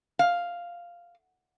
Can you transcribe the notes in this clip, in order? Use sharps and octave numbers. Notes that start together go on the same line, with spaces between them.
F5